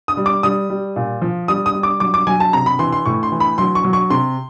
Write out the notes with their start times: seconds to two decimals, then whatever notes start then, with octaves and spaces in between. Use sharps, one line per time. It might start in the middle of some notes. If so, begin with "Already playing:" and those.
0.08 D#6
0.17 G3
0.26 D6
0.43 G3 D#6
0.70 G3
0.96 A#2
1.22 F3
1.48 G3 D#6
1.66 D#6
1.74 G3
1.83 D6
2.00 F#3 D6
2.14 D6
2.27 F#3 G#5
2.40 A5
2.53 C3 A#5
2.66 B5
2.79 E3 C6
2.92 C6
3.06 A2 C#6
3.23 C6
3.32 E3
3.40 B5
3.58 F#3 C6
3.75 C#6
3.84 F#3
3.93 C#6
4.10 C3 C6